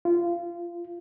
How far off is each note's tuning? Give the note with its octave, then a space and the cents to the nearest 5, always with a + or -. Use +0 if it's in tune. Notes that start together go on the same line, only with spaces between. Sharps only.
F4 -20